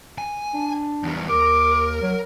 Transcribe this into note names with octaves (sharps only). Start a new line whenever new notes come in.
G#5
D4
E2 G3
D#2 A#4 D6
F#3